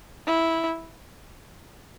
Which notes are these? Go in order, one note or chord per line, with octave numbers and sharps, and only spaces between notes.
E4